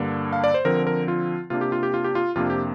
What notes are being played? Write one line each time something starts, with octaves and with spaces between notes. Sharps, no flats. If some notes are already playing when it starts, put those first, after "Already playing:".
Already playing: G2 D3 A#3 D4
F5
D5
C5
D3 F3 C4 A#4
A#4
F4
C3 A#3 D4 F4
G4
F4
G4
F4
G4
F4
F2 C3 A#3 D4 F4
G4